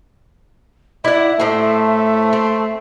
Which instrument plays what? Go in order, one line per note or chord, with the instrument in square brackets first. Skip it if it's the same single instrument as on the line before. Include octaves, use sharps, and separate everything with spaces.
[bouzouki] E4 F#5 [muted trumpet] D5 [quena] E5
[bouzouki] A2 C4 [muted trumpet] A3
[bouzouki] C4